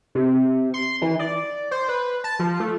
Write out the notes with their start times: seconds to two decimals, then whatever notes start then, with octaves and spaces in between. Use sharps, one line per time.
0.15 C3
0.74 C6
1.02 E3
1.19 D5
1.71 C5
1.88 B4
2.24 A5
2.39 F3
2.60 A3